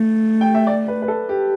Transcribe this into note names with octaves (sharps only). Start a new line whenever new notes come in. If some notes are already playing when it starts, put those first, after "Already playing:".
Already playing: A3
G5
E5
D5
B4
B4
A4
G4